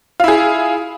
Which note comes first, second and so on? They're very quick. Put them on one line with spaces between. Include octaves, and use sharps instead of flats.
F4 E4 G#4